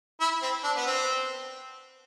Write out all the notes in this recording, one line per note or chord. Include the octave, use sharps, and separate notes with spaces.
E4
C4
D4
B3
C4